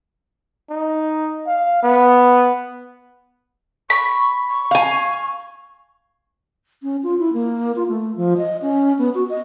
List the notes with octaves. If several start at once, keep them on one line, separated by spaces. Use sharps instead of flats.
D#4
F5
B3
B5 C#6
C#6
F5 G#5
C#4
F4
E4
A#3
F4
A3
F3
D#5
C#4
B3
F#4
D#5